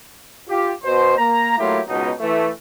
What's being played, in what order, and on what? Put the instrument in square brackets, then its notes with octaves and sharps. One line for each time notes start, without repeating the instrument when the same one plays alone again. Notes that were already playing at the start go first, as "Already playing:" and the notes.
[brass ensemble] F4 G4
B2 C5
A#3 A#5
F#3 A3 A#3 E4 F4 G4
C#2 B2 D#4
E3 A3